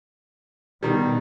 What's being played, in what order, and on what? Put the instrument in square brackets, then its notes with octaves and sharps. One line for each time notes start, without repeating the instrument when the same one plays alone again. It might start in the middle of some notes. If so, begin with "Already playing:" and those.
[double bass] B2 [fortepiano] D#3 G3